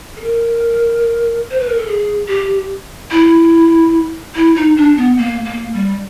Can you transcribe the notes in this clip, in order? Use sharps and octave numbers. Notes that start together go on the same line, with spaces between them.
A4
A#4
C5
B4
A#4
A4
G#4
G4
E4
E4
D#4
D4
B3
A#3
A#3
G3